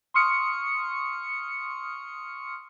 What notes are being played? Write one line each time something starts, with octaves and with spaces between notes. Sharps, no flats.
C6 C#6 D#6 F6 C#7